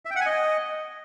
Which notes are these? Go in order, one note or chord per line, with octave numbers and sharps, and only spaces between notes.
E5
G5
F#5
G#5
D#5